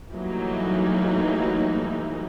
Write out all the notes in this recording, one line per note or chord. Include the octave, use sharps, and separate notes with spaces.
E3 F#3 G3 A3 A#3 D#4